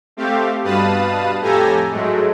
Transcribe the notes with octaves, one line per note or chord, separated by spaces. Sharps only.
A3 C4 G4 F5
G2 B2 B4 F5 A5 D#6
F2 A2 G4 A4 G#5 A#5
G#2 F#3 G#3 A3